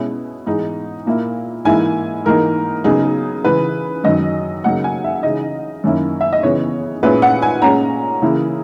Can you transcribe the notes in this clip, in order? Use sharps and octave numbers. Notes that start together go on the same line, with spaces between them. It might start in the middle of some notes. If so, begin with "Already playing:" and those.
Already playing: B2 G#3 C#4 E4
G#2 E3 G#3 D#4
A#2 A#3 E4
G#2 E3 A#3 E4 G#5
G#2 E3 A#3 D#4 A#4
C#3 F#3 B3 D#4 G#4
C#3 E3 G#3 B4
F#2 D#3 F#3 D#5
C#3 F#3 A#3 D#4 F#5
G#5
E5
C#3 E3 G#3 D#4 D#5
F#2 D#3 A#3 C#4 E4
E5
D#5
C#3 E3 B3 C#5
A#2 G#3 C#4 E4 B4
F#5
G#5
A#2 G#3 C#4 A#5
C#3 E3 A#3 E4